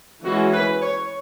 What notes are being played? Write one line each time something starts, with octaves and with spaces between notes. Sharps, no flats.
E3 G#3 C#4 F#4
B4
C#5